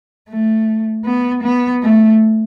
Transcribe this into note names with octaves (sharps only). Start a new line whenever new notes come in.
A3
B3
B3
A3